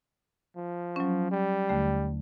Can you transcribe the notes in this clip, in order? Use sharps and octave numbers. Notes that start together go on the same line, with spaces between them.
F3
F#3 C#4
G3
D#2 D3 A3